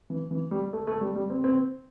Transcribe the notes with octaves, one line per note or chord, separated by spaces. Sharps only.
E3
E3
G3
A3
A3
G3
G3
C4
C4